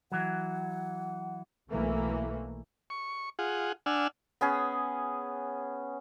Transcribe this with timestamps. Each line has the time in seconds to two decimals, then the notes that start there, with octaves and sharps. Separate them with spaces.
0.12 E3 F#3 F#5
1.70 B1 E3 A3 A#3
2.90 C#6
3.39 F4 G#4 F#5
3.86 D4 F#5 G#5 E6 F6
4.41 B3 C#4 G#4